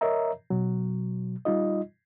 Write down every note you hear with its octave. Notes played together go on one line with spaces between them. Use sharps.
A#4 C#5 D#5 E5 A#5
B2 F#3
G3 D#4 F4 D#5